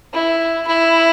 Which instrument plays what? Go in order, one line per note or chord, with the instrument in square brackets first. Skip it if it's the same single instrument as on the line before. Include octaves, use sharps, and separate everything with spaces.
[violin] E4
E4